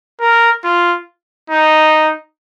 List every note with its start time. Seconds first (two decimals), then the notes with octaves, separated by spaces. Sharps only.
0.20 A#4
0.64 F4
1.50 D#4